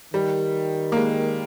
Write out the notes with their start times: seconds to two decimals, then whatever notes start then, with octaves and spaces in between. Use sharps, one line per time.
0.14 D#3 G3
0.92 A#3
0.96 G#3